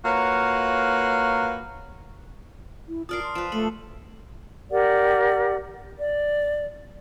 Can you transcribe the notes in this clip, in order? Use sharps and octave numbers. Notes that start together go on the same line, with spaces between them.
A#3 F4 F#4 B4 C#5
E4
F4 A#4 D5 A5 D#6 F6 C7
C6
F3 B4 E7
A3 A4 F#7
G4 A#4 D5 F#5
D5